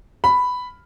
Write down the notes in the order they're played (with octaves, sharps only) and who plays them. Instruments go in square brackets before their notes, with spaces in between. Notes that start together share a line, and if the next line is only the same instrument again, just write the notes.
[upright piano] B5